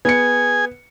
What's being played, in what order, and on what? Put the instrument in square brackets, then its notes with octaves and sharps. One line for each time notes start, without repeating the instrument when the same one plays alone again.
[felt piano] B3 C#7 [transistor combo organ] G#4 G#5